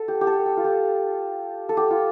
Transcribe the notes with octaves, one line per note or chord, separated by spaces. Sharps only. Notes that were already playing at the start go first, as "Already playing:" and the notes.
Already playing: A4
G4
G4
A4
G4
F4
G4
A4
G4
F4